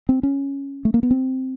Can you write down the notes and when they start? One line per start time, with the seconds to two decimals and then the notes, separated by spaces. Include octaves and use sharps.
0.09 C4
0.23 C#4
0.85 A3
0.94 A#3
1.03 B3
1.11 C4